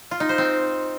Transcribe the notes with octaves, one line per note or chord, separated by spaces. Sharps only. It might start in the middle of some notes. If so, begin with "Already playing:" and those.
F4
D#4
C5
C4